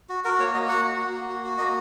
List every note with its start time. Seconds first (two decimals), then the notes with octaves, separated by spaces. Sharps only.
0.09 F#4
0.24 F#4 A#4
0.39 A#3 C#5
0.54 A#3 D#5
0.69 F#4 F#5
0.85 F#4
0.98 A#3
1.13 A#3
1.29 F#4
1.44 F#4
1.58 A#3 D#5